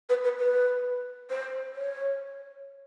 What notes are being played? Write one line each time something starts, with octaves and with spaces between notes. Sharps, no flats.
B4
B4
B4
C5
C#5